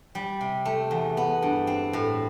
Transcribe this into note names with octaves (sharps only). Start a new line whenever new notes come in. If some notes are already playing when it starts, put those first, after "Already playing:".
G3
C3
A3
E2
B3
G2
C4
A2